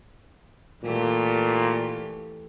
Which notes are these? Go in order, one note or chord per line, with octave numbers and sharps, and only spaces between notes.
A#2 E3 A3 G4